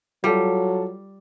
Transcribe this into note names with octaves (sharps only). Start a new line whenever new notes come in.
F#3 G3 F4 A4